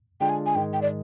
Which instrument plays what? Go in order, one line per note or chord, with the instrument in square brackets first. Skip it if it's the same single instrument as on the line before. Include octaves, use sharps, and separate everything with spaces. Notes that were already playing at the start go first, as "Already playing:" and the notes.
[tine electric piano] D3 G#3 D4 F4 G#4 [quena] G5
[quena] G#5
G#5
[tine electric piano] G#2 D#3 G#3 [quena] G5
[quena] G5
D5